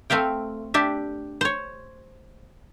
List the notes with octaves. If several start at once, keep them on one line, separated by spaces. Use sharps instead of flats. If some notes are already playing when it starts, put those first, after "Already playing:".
A3 C4 E5 F5 G5
D4 G4 E5
C5 C#5